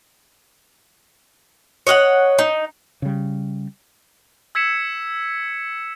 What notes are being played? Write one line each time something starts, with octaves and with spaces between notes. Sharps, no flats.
C#5 D#5 F5 F#5
D#4
C#3 G3
E6 G#6 B6 C#7 E7